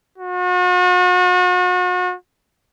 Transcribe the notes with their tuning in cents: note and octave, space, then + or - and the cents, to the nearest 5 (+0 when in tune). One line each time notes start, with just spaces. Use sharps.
F#4 -40